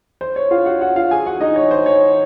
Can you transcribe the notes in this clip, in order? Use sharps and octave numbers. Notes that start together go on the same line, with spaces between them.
C5
C#5
F4 F5
F#4 F#5
F#4 F#5
F4 F5
G#4 G#5
F#4 F#5
D#4 D#5
C#5
C5
C#5